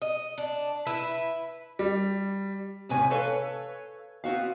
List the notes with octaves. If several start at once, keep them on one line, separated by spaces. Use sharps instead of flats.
D#5
D4
E4 B4 E5
G3
E2 A2 C3 C#4 B4 G#5
A4 B4 C#5 F5
B3 C4 F#4 F5